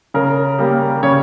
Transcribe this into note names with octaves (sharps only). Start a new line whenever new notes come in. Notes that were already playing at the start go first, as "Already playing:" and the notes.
C#3 A#4
G3 A#3
C#3 C#5